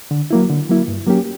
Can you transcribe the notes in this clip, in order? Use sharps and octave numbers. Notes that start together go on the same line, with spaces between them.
D3
F#3 A#3 E4
D3
F#3 A#3 E4
G2
F#3 A#3 C#4 G4